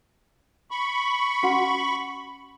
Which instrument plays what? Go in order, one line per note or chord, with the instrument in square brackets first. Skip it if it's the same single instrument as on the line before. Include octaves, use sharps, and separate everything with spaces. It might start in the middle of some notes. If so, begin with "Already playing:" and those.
[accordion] B5 C#6
[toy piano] C#4 F#4 F#5